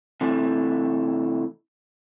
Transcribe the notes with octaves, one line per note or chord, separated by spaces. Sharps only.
C3 E3 A3